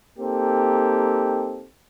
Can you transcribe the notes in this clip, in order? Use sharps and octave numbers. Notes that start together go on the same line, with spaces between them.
A#3 C4 D#4 G4 A4